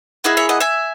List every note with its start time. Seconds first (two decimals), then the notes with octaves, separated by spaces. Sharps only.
0.24 A#3 E4 G#4 D#5 F#5
0.37 C#5 E5
0.49 D#5 F#5
0.60 E5 G#5